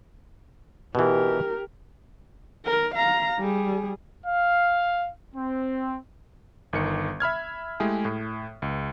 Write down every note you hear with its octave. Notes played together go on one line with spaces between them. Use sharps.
B2 E3 G4 A#4
A#4
F5 A#5
G3 G#4
F5
C4
G1 D#3 C#7
E5 B5 F6 G#6
G#3 A3 E4 G4 G#4
A2
C#2